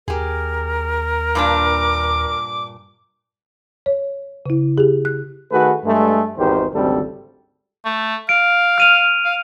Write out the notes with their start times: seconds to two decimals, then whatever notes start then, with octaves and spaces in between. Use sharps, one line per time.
0.08 D#2 G4 G#4 A#4
1.35 G2 A#2 D4 D6
3.86 C#5
4.46 C#3 E4
4.78 G4 G#4
5.05 F#6
5.51 D#3 A3 F#4 G#4 A4 B4
5.85 G2 G#3 A3
6.38 G#1 E2 D#3 G4 B4 C5
6.73 G#1 D2 C#3 G3 C4 A4
7.85 A3
8.29 F5 D7
8.78 F6 D#7 F7
9.25 F5